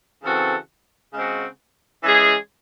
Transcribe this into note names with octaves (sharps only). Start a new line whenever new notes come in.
C#3 E3 C4 F#4 A4
C#3 G#3 C4 F#4
E3 G#3 C#4 G#4